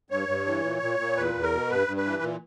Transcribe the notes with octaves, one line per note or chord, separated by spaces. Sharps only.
G2 C#5
G2
E3
A#2
A#2
A#2
E2 B4
E2
A#4
B2
G2 B4
G2
B4
E3
A#2